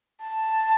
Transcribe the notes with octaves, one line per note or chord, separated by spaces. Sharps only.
A5